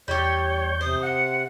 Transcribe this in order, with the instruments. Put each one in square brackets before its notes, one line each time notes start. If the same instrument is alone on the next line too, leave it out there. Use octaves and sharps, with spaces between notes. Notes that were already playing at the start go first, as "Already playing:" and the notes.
[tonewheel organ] E2 G6 [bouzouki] G3 G4 [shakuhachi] C#5
[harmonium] C3 [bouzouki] C5 [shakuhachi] D#6
[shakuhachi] F#5